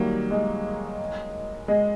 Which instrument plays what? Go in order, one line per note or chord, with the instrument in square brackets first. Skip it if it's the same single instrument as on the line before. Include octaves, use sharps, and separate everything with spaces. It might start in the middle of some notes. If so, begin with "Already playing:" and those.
Already playing: [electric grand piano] D#3 F#3 A#3 [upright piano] G3
[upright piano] G#3
G#3